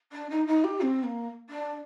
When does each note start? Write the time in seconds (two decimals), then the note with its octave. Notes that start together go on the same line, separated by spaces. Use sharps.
0.12 D4
0.30 D#4
0.47 D#4
0.64 G4
0.81 C4
1.03 A#3
1.50 D4